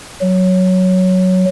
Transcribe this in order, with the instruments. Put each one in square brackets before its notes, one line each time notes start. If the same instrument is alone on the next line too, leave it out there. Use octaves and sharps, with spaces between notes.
[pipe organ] F#3